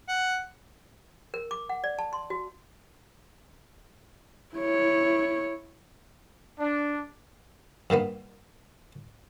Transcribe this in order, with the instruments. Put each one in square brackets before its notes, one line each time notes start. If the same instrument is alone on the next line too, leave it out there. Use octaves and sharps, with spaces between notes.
[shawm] F#5
[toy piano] A#4
D6
F#5
D5
A5
C6
F#4
[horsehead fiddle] E4 C#5
[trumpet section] D4
[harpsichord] G2 D#3 A#3 B3